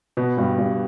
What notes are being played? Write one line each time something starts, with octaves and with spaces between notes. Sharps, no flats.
B2 B3
G2 G3
G2 G3